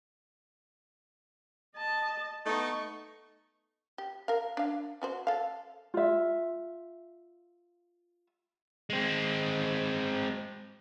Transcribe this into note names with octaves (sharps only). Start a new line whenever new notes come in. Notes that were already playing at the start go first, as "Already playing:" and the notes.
D#5 A5
A3 B3 D#4 C#6
G4
A#4 F5
D4 F5
C#4 F#4 C5
A4 F5
F4 E5
G#3 C4